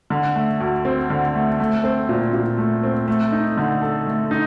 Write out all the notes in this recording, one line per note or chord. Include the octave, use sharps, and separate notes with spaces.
D3
A3
D2
C4
D3
A3
A3
C4
A#2
A#2
A3
C4
A3
D#4
D3
A4
A3
D#4